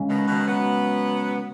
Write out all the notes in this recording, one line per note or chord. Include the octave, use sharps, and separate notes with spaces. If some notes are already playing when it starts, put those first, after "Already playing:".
Already playing: C#3 G#3 C#4
B2 D#3
B2 D#3
F#3 B3